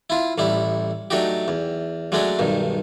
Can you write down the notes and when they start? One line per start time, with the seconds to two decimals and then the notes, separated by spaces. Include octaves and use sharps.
0.10 E4 F4
0.38 A1 G3 E4
1.10 F#3 A3 D4 D#4 F#4 G4
1.48 E2
2.12 F#3 G#3 A3 C#4 D4 F#4
2.39 B1 G2 D#3